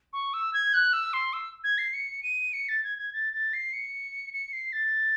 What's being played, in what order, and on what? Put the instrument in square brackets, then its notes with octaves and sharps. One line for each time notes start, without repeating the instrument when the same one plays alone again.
[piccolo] C#6
E6
G#6
F#6
E6
C6
E6
G#6
C7
C#7
D#7
C#7
A6
G#6
G#6
A6
A6
C7
C#7
C#7
C7
A6